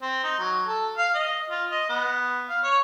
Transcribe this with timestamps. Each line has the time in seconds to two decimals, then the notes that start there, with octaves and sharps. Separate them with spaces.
0.02 C4
0.23 D#4
0.39 F#3
0.67 A4
0.97 F5
1.15 D#5
1.50 F4
1.71 D#5
1.89 B3
2.49 F5
2.64 C#5